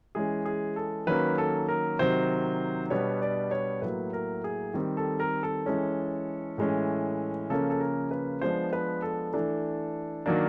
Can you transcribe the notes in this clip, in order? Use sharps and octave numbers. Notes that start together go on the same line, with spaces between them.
E3 G#3 C#4 G#4
G#4
A4
D#3 F#3 A#3 C#4 B4
A4
A#4
C3 D#3 F#3 C5
B2 G3 B3 D4 C#5
D5
C#5
A2 F#3 A#3 B4
A#4
G#4
D#3 G3 C4
A4
A#4
A4
E3 G#3 C#4
A2 E3 G#3 C#4
C#3 F3 A#3 C#4 A4
A4
A#4
B4
F3 G#3 B3 D4 C5
B4
A4
E3 A3 D4
D#3 F#3 A#3 D4